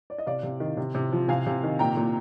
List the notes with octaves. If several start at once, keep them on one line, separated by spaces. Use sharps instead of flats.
D5
D#5
C3 D5 F5
C3
D#3
C3
C3
F3
C3 F5 G#5
C3
D#3
A#2 G5 A#5
A#2